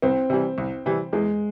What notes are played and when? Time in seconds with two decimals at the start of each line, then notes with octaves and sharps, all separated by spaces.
0.02 C2 C4
0.30 C3 E3 G3
0.58 C2
0.86 C3 E3 G3
1.13 E2 G#3